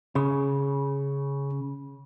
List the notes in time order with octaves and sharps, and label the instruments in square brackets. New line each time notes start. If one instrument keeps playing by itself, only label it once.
[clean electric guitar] C#3 [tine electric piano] C#4 G#4